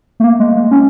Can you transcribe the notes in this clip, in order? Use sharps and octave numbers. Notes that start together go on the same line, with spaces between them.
A3
A#3
G#3
G#3
C#4